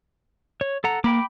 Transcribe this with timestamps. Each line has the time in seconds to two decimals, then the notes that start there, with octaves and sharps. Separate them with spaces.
0.61 C#5
0.84 A4 F#5 A#5
1.04 A#3 G5 B5 D6